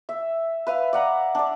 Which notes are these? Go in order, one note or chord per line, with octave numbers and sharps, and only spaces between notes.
E5
B4 E5 F5
D5 F#5 A#5
D4 D5